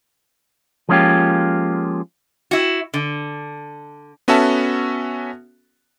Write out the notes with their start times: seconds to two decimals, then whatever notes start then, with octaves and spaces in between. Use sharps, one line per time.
0.89 F3 G#3 A#3 C#4 F4 G4
2.51 E4 F#4
2.94 D3
4.28 B3 C#4 F#4 A4 E5 A5